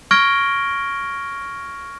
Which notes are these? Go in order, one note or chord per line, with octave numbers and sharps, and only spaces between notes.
C#6 F6 G#6 A#6 D7 G7